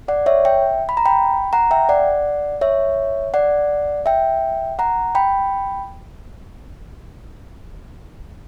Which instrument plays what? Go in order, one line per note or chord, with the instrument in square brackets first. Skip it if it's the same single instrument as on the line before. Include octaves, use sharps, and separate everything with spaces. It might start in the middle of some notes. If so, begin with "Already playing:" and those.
[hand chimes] D5 F#5
C#5 E5
E5 G5
B5
A#5
G5 B5
F#5 A#5
E5 G5
D5 F#5
C#5 E5
D5 F#5
E5 G5
F#5 A#5
G5 B5